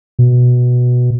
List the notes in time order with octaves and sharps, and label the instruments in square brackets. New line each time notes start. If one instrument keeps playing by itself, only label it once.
[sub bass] B2